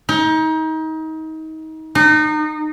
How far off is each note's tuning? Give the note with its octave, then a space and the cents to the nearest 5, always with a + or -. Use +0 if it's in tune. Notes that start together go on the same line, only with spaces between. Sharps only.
D#4 +30
D#4 -30